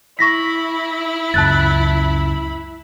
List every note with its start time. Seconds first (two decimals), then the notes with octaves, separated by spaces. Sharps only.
0.19 E4 B5 C#6 A#6 B6
1.34 C#2 F#2 A5 F#6 A6